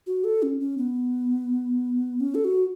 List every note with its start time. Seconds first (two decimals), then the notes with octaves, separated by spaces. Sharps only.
0.07 F#4
0.24 A4
0.43 C#4
0.60 C#4
0.78 B3
2.20 C#4
2.35 A4
2.44 F#4